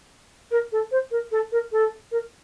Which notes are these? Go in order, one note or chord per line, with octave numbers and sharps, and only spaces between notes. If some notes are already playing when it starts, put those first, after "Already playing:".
A#4
A4
C5
A#4
A4
A#4
A4
A#4